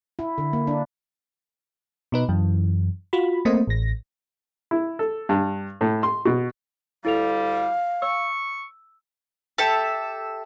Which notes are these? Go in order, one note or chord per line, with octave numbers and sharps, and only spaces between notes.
E4
D3
A#3
D4
B2 D#4 B4
F#2 E3
F4 F#4 B5
A3 A#3 C4 C5 D#5
A1 A#6
E4
A4
G2
A2
C6
B2
D2 G3 E4 A4 F5 F7
C#6 E6
G4 A4 E5 A5